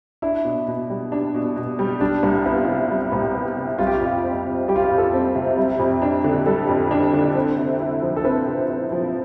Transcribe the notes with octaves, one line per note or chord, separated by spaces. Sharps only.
D4 E4
B2
B2
G3
D4
B2
B2
G3
G3 D4
C2
B3 E4
F4
C3 E4
G3
C2
B3
C3
G3 F4
G4
F4
F2
C4
C3
G3 G4
F4
G4
F2
A4
C4
C3
G3
F2
D4
D3
G3 A4
F2
D4
D3
C4
C3
E4
F3
A4
C4 B4
C3
E4
F3